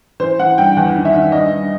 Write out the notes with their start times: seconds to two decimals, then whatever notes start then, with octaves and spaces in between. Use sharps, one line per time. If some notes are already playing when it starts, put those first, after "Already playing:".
0.20 E3 C5
0.39 E3 F#5
0.58 G2 G5
0.77 E2 F#5
0.95 D#3
1.05 E5
1.13 D#3
1.32 G2 D#5
1.51 G2